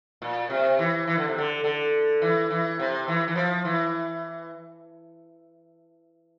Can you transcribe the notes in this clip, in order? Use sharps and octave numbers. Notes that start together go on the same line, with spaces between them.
A#2
C3
E3
E3
D3
C3
D3
D3
E3
E3
C3
E3
E3
F3
E3